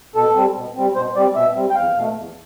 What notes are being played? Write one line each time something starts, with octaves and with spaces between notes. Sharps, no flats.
B2 A4
G3 C4
B2
G3 C4
B2 C5
G3 C4 D5
B2 E5
G3 C4
G5
E2 F5
B2 A3
E2